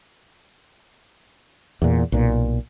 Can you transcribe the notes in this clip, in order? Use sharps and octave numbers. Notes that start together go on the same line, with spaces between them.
E2 A#2
B1 A#2